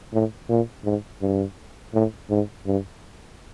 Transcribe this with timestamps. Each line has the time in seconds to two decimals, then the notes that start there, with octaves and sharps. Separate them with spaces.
0.13 A2
0.49 A#2
0.84 G#2
1.22 G2
1.93 A2
2.30 G#2
2.66 G2